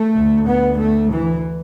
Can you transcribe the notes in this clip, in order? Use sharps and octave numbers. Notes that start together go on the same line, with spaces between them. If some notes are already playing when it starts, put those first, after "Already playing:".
Already playing: A3
D2
B3
A3
E3